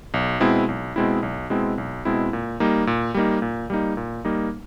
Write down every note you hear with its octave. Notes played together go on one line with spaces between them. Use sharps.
B1
B2 G#3 C4 E4
B1
B2 G#3 C4 E4
B1
B2 G#3 C4 E4
B1
B2 G#3 C4 E4
A#2
G3 A#3 D#4
A#2
G3 A#3 D#4
A#2
G3 A#3 D#4
A#2
G3 A#3 D#4